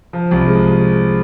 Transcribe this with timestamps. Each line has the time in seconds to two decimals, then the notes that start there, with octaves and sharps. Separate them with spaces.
0.13 F3
0.31 C2
0.47 G#3